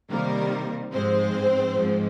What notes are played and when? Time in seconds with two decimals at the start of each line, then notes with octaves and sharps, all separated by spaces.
0.10 C3 D#3 G3 A#3 A#4
0.93 G#2 F3 G#3 C4 C5
1.76 G#2 F3 G#3